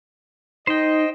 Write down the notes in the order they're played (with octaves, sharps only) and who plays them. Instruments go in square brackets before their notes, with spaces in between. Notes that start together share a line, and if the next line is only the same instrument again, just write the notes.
[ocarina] D#4 [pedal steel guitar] C5 G5 [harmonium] D#5